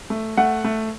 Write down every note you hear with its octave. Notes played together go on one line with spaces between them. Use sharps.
A3
A3 F#5
A3